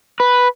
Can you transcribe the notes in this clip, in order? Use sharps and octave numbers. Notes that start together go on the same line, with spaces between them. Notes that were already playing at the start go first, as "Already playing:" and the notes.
B4